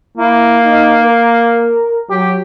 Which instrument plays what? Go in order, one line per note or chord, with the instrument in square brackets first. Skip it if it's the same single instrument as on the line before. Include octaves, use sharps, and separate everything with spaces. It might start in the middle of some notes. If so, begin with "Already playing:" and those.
[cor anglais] A#3 [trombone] E4
[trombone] D#4
A#4
[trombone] F#3 [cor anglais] G4